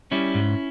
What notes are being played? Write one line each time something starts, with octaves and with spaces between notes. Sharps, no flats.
G3 C#4 E4
G#2